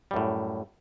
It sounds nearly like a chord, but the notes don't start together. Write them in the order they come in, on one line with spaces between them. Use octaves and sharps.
G3 F#2 A2